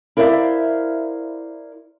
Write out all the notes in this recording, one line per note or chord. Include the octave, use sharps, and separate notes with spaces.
E4 A#4 C5 D5 E5 F5